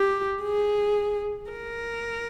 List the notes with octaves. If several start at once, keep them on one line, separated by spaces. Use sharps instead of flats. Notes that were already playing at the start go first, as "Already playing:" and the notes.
Already playing: G4
G#4
A#4